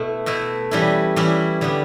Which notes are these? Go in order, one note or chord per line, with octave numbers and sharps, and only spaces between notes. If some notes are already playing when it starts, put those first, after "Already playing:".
Already playing: B2 A3 E4
B2 A3 E4
E3 G3 C#4 E4
E3 G3 C#4 E4
D3 G3 B3